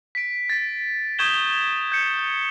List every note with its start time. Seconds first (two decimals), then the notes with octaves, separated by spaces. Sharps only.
0.15 B6 D7
0.49 A6 B6
1.19 C#6 D#6 G6 G#6 E7 G7
1.92 G6 C#7